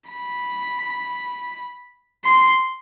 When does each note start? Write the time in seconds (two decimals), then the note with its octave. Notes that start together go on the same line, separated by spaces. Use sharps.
0.10 B5
2.25 C6